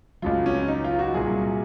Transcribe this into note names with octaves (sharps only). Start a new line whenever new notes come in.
C#2 C#3 F#3 F4
C#4
D#4
F4
F#4
C2 A#2 F#3 G#4